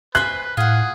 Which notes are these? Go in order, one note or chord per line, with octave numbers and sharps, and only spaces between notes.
B4 C5 G#5 B5 F#6
A2 F4 G#4 F#5